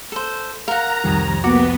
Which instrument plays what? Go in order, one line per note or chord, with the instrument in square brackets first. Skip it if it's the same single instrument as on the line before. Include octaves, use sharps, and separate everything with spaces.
[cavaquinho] A4 C5
[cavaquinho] A#4 F#5 [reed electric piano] F5 [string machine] A#5
[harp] C2 F2 D#6 [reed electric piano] D#3 G3
[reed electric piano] A#3 D6 [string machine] B3 [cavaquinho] F#4